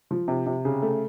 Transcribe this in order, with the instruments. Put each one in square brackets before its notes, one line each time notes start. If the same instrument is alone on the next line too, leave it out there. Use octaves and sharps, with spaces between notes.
[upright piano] F3
C3
C3
C#3
A3